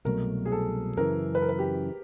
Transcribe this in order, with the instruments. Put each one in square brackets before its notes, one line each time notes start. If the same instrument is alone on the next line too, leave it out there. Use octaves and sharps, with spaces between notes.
[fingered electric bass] C2 B2 F#3 A3 [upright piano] A#4
[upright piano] G#4
A4
[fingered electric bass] F#2 C#3 E3 [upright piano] A#4
[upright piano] B4
A#4
B4
G4